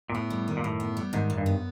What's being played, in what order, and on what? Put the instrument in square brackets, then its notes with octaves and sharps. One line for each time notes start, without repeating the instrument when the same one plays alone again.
[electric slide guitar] A#2
[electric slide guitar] A2 [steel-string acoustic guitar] B3
[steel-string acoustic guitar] G3
D#3
[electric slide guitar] A#2
[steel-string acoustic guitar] F#2 [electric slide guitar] A2
[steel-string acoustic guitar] B3
G3
[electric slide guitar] G#2 [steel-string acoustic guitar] D#3
[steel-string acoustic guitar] F#2
[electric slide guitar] G2
[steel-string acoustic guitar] B3